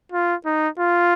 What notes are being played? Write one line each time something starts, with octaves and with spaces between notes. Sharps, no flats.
F4
D#4
F4